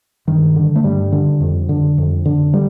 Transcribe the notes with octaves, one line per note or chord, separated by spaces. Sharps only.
G2 D#3
D3
A3
G2 G3
D3
F2
D3
F2
D3
G3